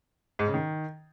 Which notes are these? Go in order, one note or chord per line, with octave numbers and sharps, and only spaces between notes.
G#2
C#3
D#3